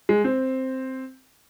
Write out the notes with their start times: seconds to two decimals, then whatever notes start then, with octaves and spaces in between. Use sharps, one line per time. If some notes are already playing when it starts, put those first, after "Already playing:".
0.09 G#3
0.24 C4